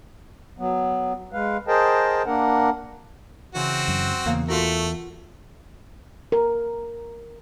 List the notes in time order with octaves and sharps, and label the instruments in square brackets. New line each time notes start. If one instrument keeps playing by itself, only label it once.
[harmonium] F#3 B3
G#3 B4 F5
G#4 A#4 C5 D#5 G5 A5
A#3 D4 A#4 F#5
[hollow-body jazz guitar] C#3 E3 [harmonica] C4 F#4
[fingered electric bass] F#2
[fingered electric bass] E2 [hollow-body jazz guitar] C#3 A#3 F5
[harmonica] A3 [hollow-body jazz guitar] F4 F#4 A#4
[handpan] A#4